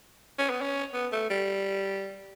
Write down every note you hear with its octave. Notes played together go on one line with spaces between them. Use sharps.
C#4
B3
C#4
B3
A3
G3